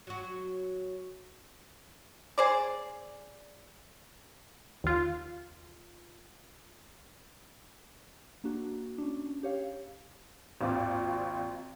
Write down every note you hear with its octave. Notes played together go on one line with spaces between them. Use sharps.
F#3 F#4
G#4 C5 D5
D#2 F4
A#3 D4 F#4
C#4 D4
G4 C#5 F5
G#1 D#2 C4 F4 D5